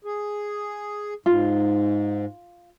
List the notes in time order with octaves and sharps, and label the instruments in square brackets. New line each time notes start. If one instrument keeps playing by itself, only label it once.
[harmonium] G#4
[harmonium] G#2 [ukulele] F4